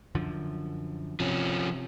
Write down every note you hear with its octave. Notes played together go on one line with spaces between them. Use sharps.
F#2 D3 F3
C3 F3 C#4